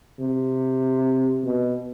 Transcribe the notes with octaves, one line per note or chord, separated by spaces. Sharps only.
C3
B2